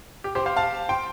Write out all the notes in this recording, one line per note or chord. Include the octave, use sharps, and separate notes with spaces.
G4
G4 C5
C5 F5
F5 A5
G5 C6